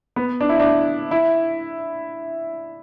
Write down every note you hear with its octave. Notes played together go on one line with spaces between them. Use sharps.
B3
D4
E4
D4
E4